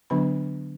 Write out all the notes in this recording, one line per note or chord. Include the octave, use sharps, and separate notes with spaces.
D3 F#3 B3 D4 B5